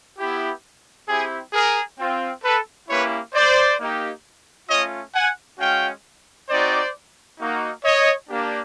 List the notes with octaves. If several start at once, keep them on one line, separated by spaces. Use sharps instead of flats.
B3 E4 G4
C4 E4 G4 G#4
G#4 A#4
C4 F4
A4 B4
A#3 C#4 E4 G4 B4 C#5
C5 D5
A#3 D#4 G4
A3 C#4 F4 C#5 D#5
F#5 G#5
G#3 C#4 F#4 F5 G5
C4 D#4 F#4 C5 D5
A#3 D#4 F#4
C#5 D#5
A#3 D4 G4